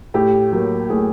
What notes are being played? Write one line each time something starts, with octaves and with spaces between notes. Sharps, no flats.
A2 G4
F#3 A#3
A2 G#4